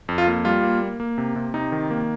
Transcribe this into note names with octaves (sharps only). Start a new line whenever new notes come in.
F2
F4
A#3
G3 F4
A#3
A#3
A#3
C3
C3
C3 D#4
D#3
A#3